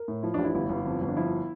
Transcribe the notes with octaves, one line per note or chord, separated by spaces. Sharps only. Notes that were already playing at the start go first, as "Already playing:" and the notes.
Already playing: A#4
A2
F3 E4
A1 D4
E4
G1 E4
G1
F2
G1
D4
F3 E4